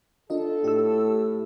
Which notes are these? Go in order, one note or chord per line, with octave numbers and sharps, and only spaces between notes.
D4 F4 A4 D#5
A2 G4 E6